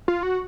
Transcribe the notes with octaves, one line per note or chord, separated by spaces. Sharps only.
F4
F#4